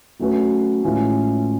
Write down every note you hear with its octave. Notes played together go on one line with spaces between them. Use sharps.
F#3 A3 C#4 F#4 B4
A2 E3 G#3 C#4 F4